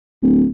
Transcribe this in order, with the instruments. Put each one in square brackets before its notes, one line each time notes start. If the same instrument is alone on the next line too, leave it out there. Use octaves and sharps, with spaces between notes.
[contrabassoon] D1